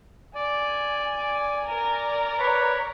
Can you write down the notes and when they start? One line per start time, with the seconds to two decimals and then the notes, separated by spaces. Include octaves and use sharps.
0.35 D5 G#5
1.66 A#4 D5
2.39 B4 C#5